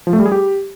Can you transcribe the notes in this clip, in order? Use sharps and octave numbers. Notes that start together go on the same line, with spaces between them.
F3
A3
G3
G#4
G4